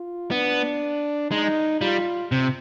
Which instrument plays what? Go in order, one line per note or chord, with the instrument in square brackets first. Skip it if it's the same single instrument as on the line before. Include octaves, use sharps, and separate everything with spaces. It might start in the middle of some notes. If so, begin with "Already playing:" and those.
Already playing: [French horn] F4
[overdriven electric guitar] B3 [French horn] D4
[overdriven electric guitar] G#3 [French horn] D#4
[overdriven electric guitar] G3 [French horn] F4
[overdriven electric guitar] C3